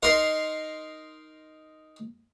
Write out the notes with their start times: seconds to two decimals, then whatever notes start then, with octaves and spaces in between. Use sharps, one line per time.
0.03 D#4 A#4 D#5 C6